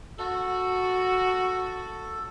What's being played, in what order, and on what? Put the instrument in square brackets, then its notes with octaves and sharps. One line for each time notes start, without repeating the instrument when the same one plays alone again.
[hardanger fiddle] F#4 [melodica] A4